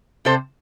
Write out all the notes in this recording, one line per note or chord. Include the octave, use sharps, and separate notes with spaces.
C3 A4 C5